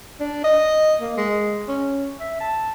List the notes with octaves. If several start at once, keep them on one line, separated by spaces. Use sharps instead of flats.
D4
D#5
A#3
G#3
C#4
E5
A5